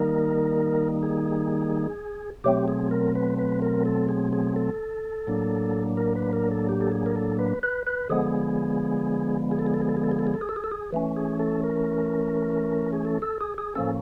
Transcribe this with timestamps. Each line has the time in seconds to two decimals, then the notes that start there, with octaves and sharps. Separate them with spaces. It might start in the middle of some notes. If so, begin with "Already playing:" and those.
Already playing: D#3 G3 A#3 D#4 A#4
1.03 G#4
2.44 B2 F#3 A3 C4 G4
2.68 G#4
2.91 A#4
3.15 B4
3.38 B4
3.62 A#4
3.85 A4
4.09 G#4
4.33 G#4
4.56 A4
5.27 A2 F#3 A#3 D4
5.97 A#4
6.16 B4
6.33 A#4
6.51 A4
6.69 G4
6.81 A4
6.92 G#4
7.06 A#4
7.16 A4
7.39 B4
7.63 B4
7.87 B4
8.09 D3 F3 G#3 B3 G#4
9.51 G#4
9.59 A4
9.67 G#4
9.74 A4
9.82 G#4
9.88 A4
9.97 G#4
10.04 A4
10.11 G#4
10.19 A4
10.27 G#4
10.34 A4
10.41 G#4
10.49 A4
10.56 G#4
10.64 A4
10.72 G#4
10.92 E3 A3 C#4
11.16 G#4
11.39 A4
11.63 A#4
12.93 G#4
13.05 A4
13.22 A4
13.41 G#4
13.58 G#4
13.75 A2 F3 A#3 C#4 A4